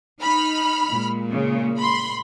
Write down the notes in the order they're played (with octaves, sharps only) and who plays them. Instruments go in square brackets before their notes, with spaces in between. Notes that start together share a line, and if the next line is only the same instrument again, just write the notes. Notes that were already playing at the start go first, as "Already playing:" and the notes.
[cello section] D#4 [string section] B5 F6
[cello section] A#2 G#3
[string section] C#3
B5 C6